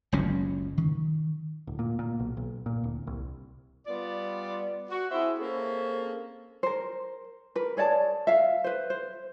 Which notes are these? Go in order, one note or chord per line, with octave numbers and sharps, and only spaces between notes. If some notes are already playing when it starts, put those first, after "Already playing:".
F#1 C#2 F#3 C#4
D#3
D1
A#2
A#2
B1
B1
A#2
D1
C2
G3 B3 F4 D5
F#4
C4 E4 G#4 C5 E5
A#3 C4 C#4 G#4 A4
A#4 C5
A#4 B4
G#4 C#5 D5 A5
E5 F5
B4 C5
C5